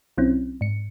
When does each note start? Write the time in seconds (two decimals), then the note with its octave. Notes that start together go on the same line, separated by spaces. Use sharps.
0.18 B1 F#3 C4 C#4 E4
0.61 G#2 C#7